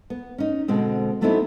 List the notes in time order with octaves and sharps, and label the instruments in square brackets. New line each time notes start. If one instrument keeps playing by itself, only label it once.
[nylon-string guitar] B3
C#4 D#4
B2 D3 G#3 C4
F#3 A3 B3 C4 D#4 E4